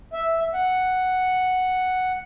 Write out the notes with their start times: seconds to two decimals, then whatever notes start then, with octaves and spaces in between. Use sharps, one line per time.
0.13 E5
0.53 F#5